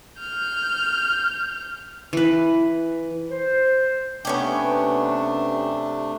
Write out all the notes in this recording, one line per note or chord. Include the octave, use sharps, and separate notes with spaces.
F6 G6
E3 B4
C5
C3 A3 B3 C#4 D4 G4